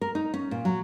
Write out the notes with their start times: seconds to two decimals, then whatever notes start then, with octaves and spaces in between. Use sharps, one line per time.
0.01 A#4
0.15 D#4
0.34 C#4
0.51 A#2
0.65 F#3